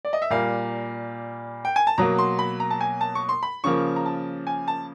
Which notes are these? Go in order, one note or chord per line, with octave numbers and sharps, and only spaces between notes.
D5
D#5
E5
A#2 G3 A#3 F5
G5
G#5
A5
B2 F#3 A#3 A#5
C6
B5
A#5
A5
G#5
A5
C#6
C6
B5
C#3 F3 A#3 C#6
A#5
A5
G#5
A5